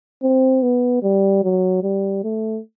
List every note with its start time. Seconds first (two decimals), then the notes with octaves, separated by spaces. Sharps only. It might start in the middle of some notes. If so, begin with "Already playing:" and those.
0.23 C4
0.62 B3
1.03 G3
1.43 F#3
1.83 G3
2.24 A3